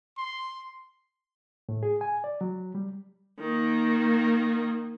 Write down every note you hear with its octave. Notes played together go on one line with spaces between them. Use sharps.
C6
A2
G#4
G#5
D5
F#3
G3
D#3 A#3